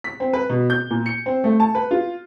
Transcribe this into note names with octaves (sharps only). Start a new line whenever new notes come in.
B6
C4
B4
B2
G6
A#2
C#7
C4
A3
A5
B4
F4